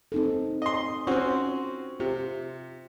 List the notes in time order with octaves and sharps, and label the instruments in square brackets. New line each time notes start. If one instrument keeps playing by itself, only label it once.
[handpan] C4 D#4 A4
[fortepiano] D#5 C6
[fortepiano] C4 C#4 F#4 [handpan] F4 C5
[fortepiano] C3 [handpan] F4